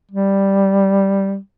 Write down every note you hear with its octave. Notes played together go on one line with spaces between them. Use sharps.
G3